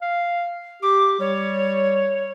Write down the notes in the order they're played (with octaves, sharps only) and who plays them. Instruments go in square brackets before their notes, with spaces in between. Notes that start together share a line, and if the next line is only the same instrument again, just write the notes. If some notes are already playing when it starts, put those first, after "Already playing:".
[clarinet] F5
[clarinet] G4 [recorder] D6
[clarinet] G3 [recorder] C#5